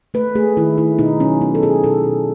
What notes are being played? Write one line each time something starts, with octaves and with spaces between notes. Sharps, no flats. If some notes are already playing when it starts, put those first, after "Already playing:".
A3 B4
A3 G#4
D#3 E4
A3 E4
B2 D#4
F#3 C#4
B3 D#4
A4
B2 G#4
B2 A4
B2